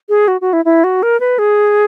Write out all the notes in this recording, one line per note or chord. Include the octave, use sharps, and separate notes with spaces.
G#4
F#4
F#4
E4
E4
F#4
A#4
B4
G#4